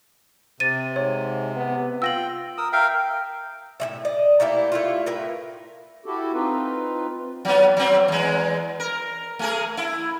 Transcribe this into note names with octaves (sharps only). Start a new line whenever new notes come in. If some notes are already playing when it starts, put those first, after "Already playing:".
C3 C5 A6 D#7
G#2 C#5
B3
F4 G5 E6 A#6 F#7
A#4 D#6 E6
A#4 E5 F5 G5
G5
A2 G#3 E5
D5 D#5
A3 A#3 E4 G4
A3 E4 F4
A2 A#4 B4
E4 F#4 G4 A4
C4 D#4 F4 B4
F#3 B3
F#3 C4
E2 G#3
A#4
A3 G#4 A#4
E4